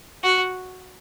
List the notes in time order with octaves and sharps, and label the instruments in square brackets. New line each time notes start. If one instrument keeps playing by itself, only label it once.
[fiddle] F#4